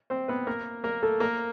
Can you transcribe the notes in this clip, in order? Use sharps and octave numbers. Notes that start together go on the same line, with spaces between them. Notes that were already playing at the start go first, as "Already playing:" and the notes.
C4 C5
B3 B4
A#3 A#4
A#3 A#4
A3 A4
A#3 A#4